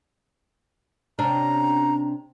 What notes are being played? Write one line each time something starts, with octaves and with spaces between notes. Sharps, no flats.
C3 C#4 D4 A#5